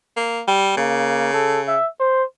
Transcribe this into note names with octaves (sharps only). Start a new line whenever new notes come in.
A#3
G3
C#3 A#3
A4
E5
C5